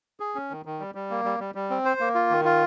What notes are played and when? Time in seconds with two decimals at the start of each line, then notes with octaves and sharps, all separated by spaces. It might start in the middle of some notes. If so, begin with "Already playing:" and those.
0.20 G#4
0.35 C#4
0.50 D#3
0.65 D#3
0.80 G3
0.95 G3
1.10 A#3
1.25 G3
1.40 G3
1.55 G3
1.70 C4
1.85 C5
2.00 A#3
2.15 F4
2.30 D#3
2.45 F4